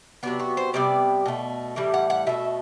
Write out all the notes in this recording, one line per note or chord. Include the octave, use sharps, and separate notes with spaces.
C3 F#3 B3 D4
F#4
C5
C3 G3 B3 D5
B2 A3
A2 E3 G3
F#5
F#5
B2 A3 E5